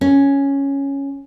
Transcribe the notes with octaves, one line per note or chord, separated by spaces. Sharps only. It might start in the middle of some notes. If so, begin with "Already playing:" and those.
C#4